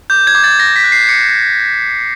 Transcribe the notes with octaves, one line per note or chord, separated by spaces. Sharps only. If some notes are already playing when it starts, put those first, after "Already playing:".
D6 G6
G#6
D6
A6
D6 A#6
B6
F#6
C7
D6 C#7